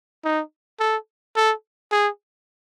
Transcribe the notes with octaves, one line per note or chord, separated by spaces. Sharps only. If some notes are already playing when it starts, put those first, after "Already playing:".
D#4
A4
A4
G#4